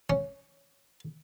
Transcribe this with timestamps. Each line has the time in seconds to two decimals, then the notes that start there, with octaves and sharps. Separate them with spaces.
0.10 C#4